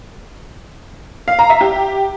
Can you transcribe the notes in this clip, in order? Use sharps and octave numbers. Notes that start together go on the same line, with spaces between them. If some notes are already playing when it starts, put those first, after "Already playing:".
F5
A#5
E5
G4